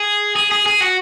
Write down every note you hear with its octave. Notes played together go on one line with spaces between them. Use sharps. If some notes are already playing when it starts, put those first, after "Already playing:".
Already playing: G#4
G#4
G#4
G#4
F#4